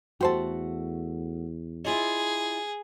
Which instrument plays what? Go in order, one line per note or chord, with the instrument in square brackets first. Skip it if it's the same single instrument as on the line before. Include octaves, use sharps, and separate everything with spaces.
[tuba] E2 [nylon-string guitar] A3 F#4 [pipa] G4 C5 A5
[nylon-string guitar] E4 F4 D#5 [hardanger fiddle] G#4